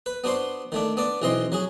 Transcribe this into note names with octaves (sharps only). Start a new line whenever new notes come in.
B4
B3 D4 F#4 C5 C6
D#3 A3 D4
B3 D4 D5
B1 E3 C4 D#5 C6
F#3 F#4 G#4